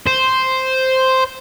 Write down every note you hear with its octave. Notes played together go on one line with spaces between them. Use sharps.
C5